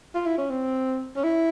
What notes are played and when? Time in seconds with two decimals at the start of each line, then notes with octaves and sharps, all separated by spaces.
0.15 F4
0.26 E4
0.38 C#4
0.50 C4
1.16 C#4
1.24 E4